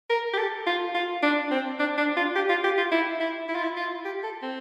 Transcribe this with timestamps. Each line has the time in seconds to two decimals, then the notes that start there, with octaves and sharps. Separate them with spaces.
0.10 A#4
0.33 G4
0.38 A4
0.67 F4
0.95 F4
1.23 D4
1.51 C4
1.79 D4
1.98 D4
2.17 F4
2.36 G4
2.49 F4
2.64 G4
2.78 F4
2.92 E4
3.20 E4
3.48 E4
3.56 F4
3.63 E4
3.77 F4
4.05 G4
4.24 A4
4.42 C4